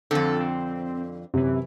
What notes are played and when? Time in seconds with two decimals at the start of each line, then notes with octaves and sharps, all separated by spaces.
0.11 F2 D3 C4 F4 A4
0.40 C4
1.34 F#2 C3 E3